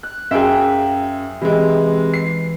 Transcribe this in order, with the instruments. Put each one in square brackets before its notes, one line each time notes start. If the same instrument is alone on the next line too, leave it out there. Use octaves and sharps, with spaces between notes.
[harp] F#6
[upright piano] F#2 G#4 [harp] E5 F5 G5
[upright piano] C3 G#3 [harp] E3
[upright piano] C7